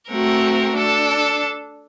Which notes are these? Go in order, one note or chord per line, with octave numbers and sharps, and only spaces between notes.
A3 C4 F#4 A#4
D4 A4